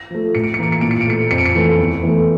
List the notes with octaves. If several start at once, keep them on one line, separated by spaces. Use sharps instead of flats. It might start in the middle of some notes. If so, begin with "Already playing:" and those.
Already playing: A#6
F3 A3
A2 C#7
D7
C#7
E3 A#3 D7
C#7
A#2 D7
C#7
D7
A3 C#7
F2 C#7
D7
C#7
E3 A3
E2
E3 A3